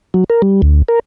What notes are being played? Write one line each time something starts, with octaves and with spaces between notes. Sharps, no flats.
F#3
A#4
G3
D2
A#4